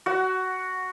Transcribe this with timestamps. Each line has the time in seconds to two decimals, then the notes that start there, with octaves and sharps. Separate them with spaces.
0.06 F#4 F#5